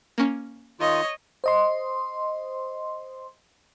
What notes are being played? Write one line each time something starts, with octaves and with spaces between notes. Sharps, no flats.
A#3 C#4
D#3 D#4 F4 C#5 D#5
C5 D#5 C6